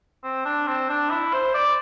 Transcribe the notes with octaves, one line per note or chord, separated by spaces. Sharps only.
C4
D4
C4
D4
E4
C5
D5